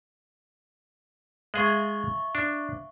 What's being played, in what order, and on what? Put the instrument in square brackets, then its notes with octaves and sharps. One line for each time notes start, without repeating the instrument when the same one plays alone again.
[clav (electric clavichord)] G#3 G#4 [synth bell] E5 F5 C#6
[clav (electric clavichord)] D4